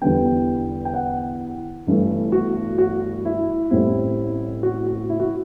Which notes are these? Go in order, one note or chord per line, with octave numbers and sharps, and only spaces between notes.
E2 D3 G3 B3 G5
G5
F#5
G1 G2 E3 A3
F#4
F#4
E4
A1 A2 G3 C4 E4
F#4
F#4
E4
F#4